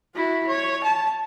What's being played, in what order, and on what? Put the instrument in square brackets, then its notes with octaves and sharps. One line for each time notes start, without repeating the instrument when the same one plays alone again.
[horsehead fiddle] E4 F#4
C#5
A5